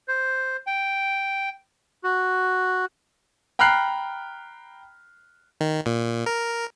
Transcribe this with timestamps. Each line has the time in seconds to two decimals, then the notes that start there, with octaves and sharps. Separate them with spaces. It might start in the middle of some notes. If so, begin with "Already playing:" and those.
0.08 C5
0.67 G5
2.04 F#4
3.59 G5 A#5 B5 F6 F#6 C7
5.61 D#3
5.86 A#2
6.26 A#4